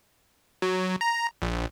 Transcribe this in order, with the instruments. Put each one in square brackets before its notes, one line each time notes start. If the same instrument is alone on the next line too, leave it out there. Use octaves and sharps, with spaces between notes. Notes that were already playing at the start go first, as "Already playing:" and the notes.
[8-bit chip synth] F#3
A#5
A#1